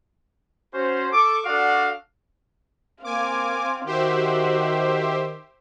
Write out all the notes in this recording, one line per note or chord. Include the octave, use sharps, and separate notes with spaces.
C#4 F#4 C5
A4 C#6 D6
D4 F#4 A4 D5 F5 F#5
A#3 C4 F5 G#5 D6
D#3 F#4 G4 C5 E5